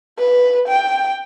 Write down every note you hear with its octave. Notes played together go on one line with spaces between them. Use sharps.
B4
G5